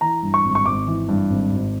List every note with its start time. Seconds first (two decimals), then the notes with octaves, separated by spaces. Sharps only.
0.01 E3 A#5
0.23 G2
0.34 C#6
0.45 G#1
0.55 C#6
0.66 G#1 D6
0.87 E3
1.09 G2
1.30 G#1
1.52 G#1